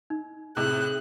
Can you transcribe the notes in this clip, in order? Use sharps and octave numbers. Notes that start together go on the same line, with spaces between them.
D#4
A2 C3 G#4 F#6